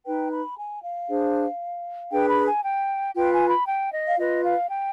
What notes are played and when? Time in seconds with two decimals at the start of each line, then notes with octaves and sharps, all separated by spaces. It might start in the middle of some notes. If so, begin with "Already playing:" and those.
0.06 D#4 B4 G5
0.31 B5
0.57 G#5
0.83 F5
1.09 D4 G#4 C5
2.12 D4 G#4 B4 G5
2.29 B5
2.46 G#5
2.63 G5
3.15 F4 B4 G5
3.32 G#5
3.49 B5
3.67 G5
3.92 D#5
4.07 F5
4.18 F4 B4 D#5
4.44 F5
4.70 G5